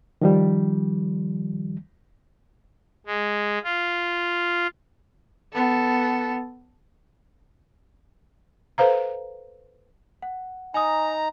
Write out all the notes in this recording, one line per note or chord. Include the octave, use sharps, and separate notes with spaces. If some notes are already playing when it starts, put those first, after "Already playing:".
D#3 F3 G3
G#3
F4
B3 A4
A4 B4 C5 F5 A#5
F#5
D#4 G#5 A#5 D#6